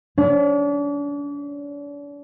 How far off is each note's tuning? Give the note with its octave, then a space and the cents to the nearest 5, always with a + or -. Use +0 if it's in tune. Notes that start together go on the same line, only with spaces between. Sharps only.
D4 -40